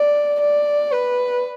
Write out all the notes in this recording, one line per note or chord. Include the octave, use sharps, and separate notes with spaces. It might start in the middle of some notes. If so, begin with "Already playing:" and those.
Already playing: D5
D5
B4